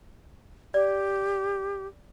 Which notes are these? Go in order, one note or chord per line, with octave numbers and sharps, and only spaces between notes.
G4 D5